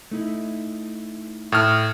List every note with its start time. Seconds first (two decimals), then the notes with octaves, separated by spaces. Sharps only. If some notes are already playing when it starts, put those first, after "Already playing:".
0.11 A3 D#4 E4
1.52 A2 F6